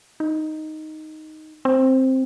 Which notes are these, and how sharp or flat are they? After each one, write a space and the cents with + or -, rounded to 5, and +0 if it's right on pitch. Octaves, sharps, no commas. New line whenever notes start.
D#4 +0
C4 +5